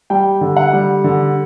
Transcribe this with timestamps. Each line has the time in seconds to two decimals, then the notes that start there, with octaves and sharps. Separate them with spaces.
0.10 G3 G5
0.41 D3
0.57 F#5
0.73 G3
1.04 D3